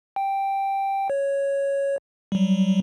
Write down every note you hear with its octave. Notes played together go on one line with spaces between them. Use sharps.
G5
C#5
F#3 G3